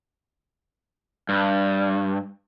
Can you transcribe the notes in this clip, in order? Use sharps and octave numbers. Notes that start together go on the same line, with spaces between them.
G2